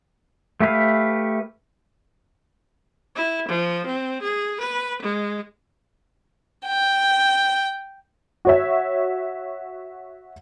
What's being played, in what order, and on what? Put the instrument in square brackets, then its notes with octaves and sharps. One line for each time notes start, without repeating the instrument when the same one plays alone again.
[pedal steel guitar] A3 G4 B4 F5
[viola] E4
F3
C4
G#4
B4
G#3
[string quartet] G5
[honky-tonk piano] F#4 C#5 E5